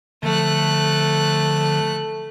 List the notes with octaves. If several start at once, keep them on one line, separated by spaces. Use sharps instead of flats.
D3 F3 A3 F#6